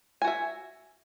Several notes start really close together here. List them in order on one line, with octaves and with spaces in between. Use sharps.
G#5 F#4 E5